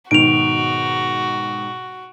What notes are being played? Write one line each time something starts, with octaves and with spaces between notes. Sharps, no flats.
G#2 B2 D#3 F#4 D7 F7